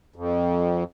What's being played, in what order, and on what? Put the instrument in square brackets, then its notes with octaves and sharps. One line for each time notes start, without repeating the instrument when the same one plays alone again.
[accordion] F2